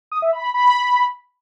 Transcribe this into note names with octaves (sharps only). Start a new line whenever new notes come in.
D#6
E5
B5
B5
B5